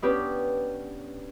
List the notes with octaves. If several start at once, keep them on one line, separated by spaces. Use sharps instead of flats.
B3 C#4 D4 G4